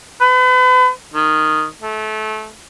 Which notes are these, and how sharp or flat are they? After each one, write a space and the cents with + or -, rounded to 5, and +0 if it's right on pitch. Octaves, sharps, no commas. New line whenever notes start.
B4 +40
D#3 -5
A3 -25